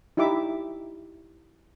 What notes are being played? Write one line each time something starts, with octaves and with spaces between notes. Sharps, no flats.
D#4 E4 G4 E5 D6